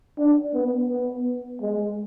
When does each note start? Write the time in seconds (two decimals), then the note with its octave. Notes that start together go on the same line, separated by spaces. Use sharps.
0.18 D4
0.53 B3
0.89 B3
1.61 G#3